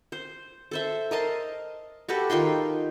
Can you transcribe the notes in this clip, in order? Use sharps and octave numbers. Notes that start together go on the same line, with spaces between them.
C5
A4 C5 E5
A#4 D#5 A5 C6
F#4 G4 A4 B4
D#3 F4 G5 C6